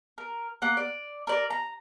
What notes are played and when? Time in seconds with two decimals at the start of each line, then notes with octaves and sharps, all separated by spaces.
0.18 A#4
0.62 A#3 F#5
0.77 D5
1.27 A#4 D5
1.50 A#5